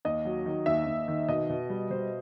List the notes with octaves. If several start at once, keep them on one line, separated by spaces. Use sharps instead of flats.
D#2 D#5
F#3
D#3
D#2 E5
D#2
D#3
B2 D#5
B2
G3
B2 C5